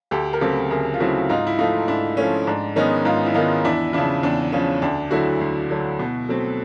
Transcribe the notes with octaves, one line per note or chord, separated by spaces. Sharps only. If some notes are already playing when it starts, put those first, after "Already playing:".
D2 G4 A4
A#4
C#3 F#3 A3 C4 G4 A4
D2 G#4 A#4
F4
C#3 F#3 A3 C4 E4 F#4
G#2 D#4 F4
E4
F3 A3 D#4 F4
G#2 D4 E4
F3 A3 C#4
G#2 D4
D#3 G#3 B3 C#4 D#4
G#2 D#4 F4
E4
D#3 G#3 B3 D#4 F4
E2 D4 E4
C#3 F3 D4 E4
E2 D4
C#3 F3 C#4
D2 D4
D3 F#3 A3 E4 F#4
D2
D3 F#3 A3
B2
F#3 A3 C4